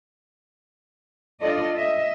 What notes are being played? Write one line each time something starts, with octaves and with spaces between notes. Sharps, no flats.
D4 F4 A4 D5 D#5
D#5 E5